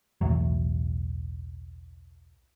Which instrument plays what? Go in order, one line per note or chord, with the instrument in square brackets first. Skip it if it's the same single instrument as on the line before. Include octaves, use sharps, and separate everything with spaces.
[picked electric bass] B1 E2 A2 F#3